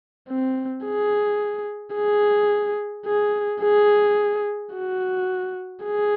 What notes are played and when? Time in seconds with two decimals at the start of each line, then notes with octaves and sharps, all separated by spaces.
0.29 C4
0.85 G#4
1.95 G#4
3.06 G#4
3.62 G#4
4.73 F#4
5.84 G#4